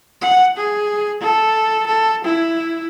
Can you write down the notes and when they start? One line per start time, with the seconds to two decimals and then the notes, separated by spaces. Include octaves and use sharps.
0.22 F#5
0.57 G#4
1.21 A4
1.87 A4
2.24 E4